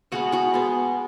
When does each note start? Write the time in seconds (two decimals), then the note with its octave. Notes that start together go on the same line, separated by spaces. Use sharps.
0.12 B2 G#3 B3 F#4 F#5
0.32 F#4 F#5
0.53 B2 G#3 B3